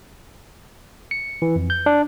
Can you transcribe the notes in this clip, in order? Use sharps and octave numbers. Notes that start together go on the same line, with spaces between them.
C#7
E3
F2
G6
D4